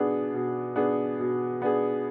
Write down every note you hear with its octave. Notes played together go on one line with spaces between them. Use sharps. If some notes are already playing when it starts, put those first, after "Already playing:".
Already playing: B2 B3 D4 G#4
B2
B3 D4 G#4
B2
B3 D4 G#4